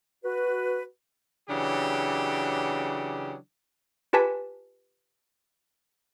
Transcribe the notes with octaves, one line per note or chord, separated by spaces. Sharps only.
F#4 B4
C#3 E3 F#3 D4 G4
F4 G4 B4 G#5 A5 B6